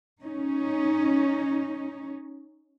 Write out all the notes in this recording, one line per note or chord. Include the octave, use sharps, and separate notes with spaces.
C#4 D#4